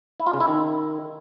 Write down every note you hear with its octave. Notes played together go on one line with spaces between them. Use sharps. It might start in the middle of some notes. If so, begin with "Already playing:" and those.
E4
F4
C#3
E4
D#3